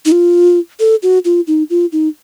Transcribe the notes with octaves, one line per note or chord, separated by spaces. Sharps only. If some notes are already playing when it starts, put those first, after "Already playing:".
D#4
F4
A4
F#4
F4
D#4
F4
D#4